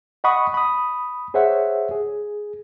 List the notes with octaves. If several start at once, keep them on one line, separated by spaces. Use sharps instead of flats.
D#5 F#5 B5 C#6 D#6
B5 D#6
G#4 C5 C#5 E5 F#5
G#4